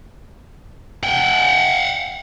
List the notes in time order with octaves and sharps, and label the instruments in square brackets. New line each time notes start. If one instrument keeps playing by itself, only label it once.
[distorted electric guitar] F#5 G5